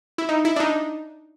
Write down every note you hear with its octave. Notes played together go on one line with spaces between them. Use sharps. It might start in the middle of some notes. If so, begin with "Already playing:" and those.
E4
D#4
E4
D4
D#4